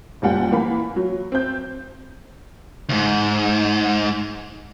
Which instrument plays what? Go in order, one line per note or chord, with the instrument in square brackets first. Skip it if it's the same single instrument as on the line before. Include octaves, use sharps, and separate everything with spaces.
[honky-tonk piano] F#1 A#2 G3 F#5 G5
E3 A#3 B5
F#3
C4 G6
[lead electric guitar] D2 G#2